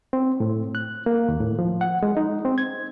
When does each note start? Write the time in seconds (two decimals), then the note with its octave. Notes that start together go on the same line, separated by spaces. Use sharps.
0.13 C4
0.40 A2
0.75 F#6
1.06 A#3
1.28 D#2
1.40 A2
1.59 F3
1.81 F#5
2.03 G#3
2.17 D#4
2.45 C4
2.58 G#6